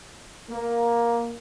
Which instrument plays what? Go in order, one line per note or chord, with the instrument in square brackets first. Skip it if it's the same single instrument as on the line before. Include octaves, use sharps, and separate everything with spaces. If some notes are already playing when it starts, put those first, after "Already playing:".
[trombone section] A#3